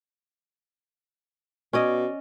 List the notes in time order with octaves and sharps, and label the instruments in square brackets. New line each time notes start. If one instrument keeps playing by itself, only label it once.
[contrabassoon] B2 [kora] C#4 D5 D#5